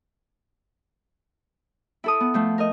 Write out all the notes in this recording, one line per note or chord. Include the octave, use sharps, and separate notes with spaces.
E4 A4 D#6
B3
F3 A3
A#4 D#5